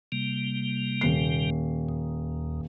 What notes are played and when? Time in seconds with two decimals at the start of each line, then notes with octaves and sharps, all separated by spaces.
0.12 C3 G3 A#3
1.01 D#1 C7
1.89 D#2